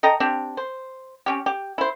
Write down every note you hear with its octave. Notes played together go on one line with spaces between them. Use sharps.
A4 D#5 G5 A#5
C4 D4 G4
C5
C4 C#4 G4
G4
E4 C5